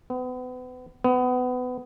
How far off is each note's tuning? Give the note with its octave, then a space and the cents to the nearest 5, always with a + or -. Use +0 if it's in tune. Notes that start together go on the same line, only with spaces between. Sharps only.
B3 +35
B3 +25